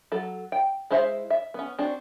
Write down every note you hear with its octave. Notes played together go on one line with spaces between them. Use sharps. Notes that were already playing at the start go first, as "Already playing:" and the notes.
F#3 A4
G5
G#3 E4 C5 E5 F5
E5
B3 C#4
C4 D4 F#4